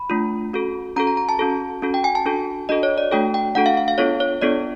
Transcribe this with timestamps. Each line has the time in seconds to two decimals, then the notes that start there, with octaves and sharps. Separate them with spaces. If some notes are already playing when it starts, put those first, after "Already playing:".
Already playing: B5
0.10 A3 D4 F4
0.53 C#4 F#4 A4
0.96 C#4 F#4 A4 A#5
1.07 A#5
1.17 A#5
1.29 A5
1.39 C#4 F#4 A4
1.82 C#4 F#4 A4
1.94 G5
2.04 G#5
2.15 A5
2.25 D4 F#4 A4
2.69 D4 F#4 A4 D#5
2.83 C#5
2.98 D5
3.11 A3 D4 F#4 A4 G5
3.34 G5
3.55 A3 D4 F#4 A4 F#5
3.66 F5
3.77 F5
3.88 F5
3.98 B3 D4 F4 A4 C#5
4.20 C#5
4.42 B3 D4 F4 A4 D5